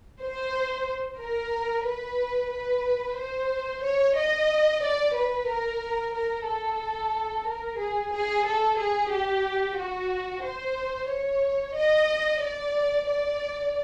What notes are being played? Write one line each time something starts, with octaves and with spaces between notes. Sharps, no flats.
C5
A#4
B4
B4
C5
C#5
D#5
D5
B4
A#4
A#4
A4
A#4
G#4
G#4
A4
G#4
G4
F#4
C5
C#5
D#5
D5
D5